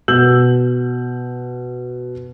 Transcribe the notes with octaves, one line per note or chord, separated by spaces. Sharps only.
B2 E6 G6 F#7